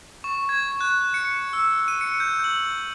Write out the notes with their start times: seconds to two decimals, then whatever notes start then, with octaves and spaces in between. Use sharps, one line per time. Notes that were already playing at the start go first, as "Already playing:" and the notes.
0.24 C#6
0.49 G#6
0.81 F#6
1.14 C#7
1.53 E6
1.88 D#7
2.01 C#7
2.20 G6
2.44 F#7